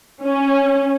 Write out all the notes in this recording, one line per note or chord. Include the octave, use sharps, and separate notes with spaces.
C#4